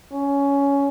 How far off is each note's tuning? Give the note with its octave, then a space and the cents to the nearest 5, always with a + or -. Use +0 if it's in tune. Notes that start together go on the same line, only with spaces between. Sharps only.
C#4 +15